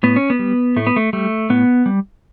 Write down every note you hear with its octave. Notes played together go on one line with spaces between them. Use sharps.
A2 B3
C#4
B3
G3
A2 A3
B3
A3
G3 A3
A2 B3
G3